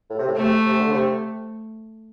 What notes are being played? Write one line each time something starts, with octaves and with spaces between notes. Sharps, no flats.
A2
C3
A2
C3 A3
C3
D3
C3